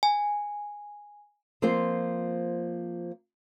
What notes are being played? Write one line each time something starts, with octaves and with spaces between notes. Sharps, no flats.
G#5
F3 A#3 C4 C5